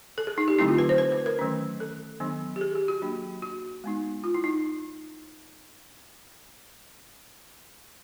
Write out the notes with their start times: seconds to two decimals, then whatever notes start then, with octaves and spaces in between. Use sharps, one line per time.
0.18 A4
0.27 G#4
0.38 D#4
0.48 G4
0.59 D3 F#3 A3 C4 D#4 E4
0.68 F4
0.79 B4
0.89 C5
0.98 B4
1.12 B4
1.26 A#4
1.39 D#3 F#3 A3 C#4
1.80 A4
2.20 D#3 F#3 B3 D4
2.56 G4
2.61 G#4
2.75 G4
2.88 F#4
3.02 F#3 A#3 D4
3.42 F#4
3.84 G#3 B3 D#4
4.24 F4
4.34 E4
4.44 D#4